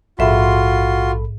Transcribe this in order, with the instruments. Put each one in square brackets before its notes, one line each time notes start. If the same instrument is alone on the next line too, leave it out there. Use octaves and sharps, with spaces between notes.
[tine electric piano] A#1 A4 B5 [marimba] G#2 E5 [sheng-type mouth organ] F4 F#4 C6